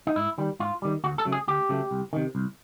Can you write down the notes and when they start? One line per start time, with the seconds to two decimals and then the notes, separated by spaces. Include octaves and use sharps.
0.07 D#4
0.16 G#2 E4
0.38 D#3 G3
0.60 G#2 F4
0.82 D#3 G3
1.04 D2 F#4
1.18 A4
1.25 C#3 F#3 A3
1.32 G#4
1.48 D2 G4
1.69 C#3 F#3 A3
1.91 C2
2.13 C3 D#3
2.35 C2